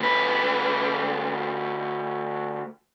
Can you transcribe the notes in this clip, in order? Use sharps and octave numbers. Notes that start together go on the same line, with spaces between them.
D2 B4